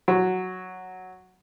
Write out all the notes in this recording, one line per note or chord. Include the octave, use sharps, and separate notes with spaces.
F#3